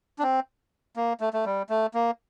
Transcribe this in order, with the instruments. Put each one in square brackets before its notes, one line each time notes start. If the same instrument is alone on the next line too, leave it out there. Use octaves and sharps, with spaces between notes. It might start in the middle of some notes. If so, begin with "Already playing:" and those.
[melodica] D4
C4
A#3
A3
A3
G3
A3
A#3